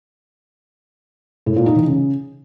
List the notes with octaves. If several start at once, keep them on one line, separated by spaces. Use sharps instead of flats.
A2
A#2
D#4
E3
C#3